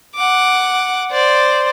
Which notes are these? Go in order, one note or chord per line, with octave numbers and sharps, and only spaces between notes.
F#5 D6
C5 D5